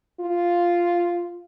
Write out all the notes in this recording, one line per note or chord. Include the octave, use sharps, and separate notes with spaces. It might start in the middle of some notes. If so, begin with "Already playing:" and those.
F4